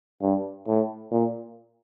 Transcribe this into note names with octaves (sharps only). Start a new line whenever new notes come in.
G2
A2
A#2